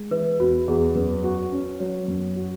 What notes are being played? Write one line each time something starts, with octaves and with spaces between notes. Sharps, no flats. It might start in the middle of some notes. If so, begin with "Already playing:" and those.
Already playing: G#3
E3 B4
E2 F#4
E2 G#4
F#2 B4
F#4
C#4
F#3 C#5
F#2
F#4